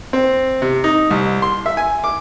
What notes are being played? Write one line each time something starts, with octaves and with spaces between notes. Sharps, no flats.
C4
C3
D#4
C2
C6
E5
G#5
D6